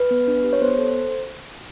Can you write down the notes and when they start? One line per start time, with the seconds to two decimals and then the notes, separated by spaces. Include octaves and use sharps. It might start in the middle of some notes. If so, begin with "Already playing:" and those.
Already playing: B4
0.11 B3
0.28 D4
0.44 G4
0.53 C#5
0.62 B3 C5
0.78 A4